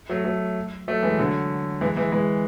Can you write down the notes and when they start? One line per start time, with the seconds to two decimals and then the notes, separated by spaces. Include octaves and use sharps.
0.10 F#3 A3
0.25 F#3 A3
0.88 F#3 A3
1.02 E3 G#3
1.19 D3 F#3
1.81 E3 G#3
1.96 E3 G#3
2.12 E3 G#3